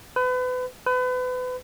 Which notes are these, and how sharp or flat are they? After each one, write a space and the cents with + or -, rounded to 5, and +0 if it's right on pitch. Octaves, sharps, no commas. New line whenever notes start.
B4 +35
B4 +35